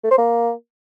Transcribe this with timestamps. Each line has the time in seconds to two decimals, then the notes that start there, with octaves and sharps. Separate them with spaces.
0.04 A3
0.11 C5
0.18 A#3